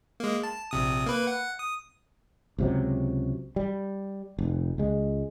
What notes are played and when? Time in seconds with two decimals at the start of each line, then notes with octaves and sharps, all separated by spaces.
0.20 G#3 A#3
0.43 A5
0.71 A#1 C3 D#6
1.06 A#3 B4
1.27 F#5
1.59 D#6
2.59 C#2 C3 F#3
3.56 G3
4.39 F1
4.78 C#2 G#3